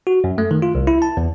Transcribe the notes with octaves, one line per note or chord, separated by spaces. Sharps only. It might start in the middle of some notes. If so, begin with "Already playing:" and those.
F#4
F#2
A3
D#3
F4
C2
E4
A5
E2